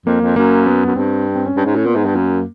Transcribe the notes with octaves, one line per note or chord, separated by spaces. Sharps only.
F2 A#3
F2
F#2 A#3
B3
F#2
G2 C4
C4
C#4
G2
G#2
A2
A#2 B3
G#2
G2
F#2 A#3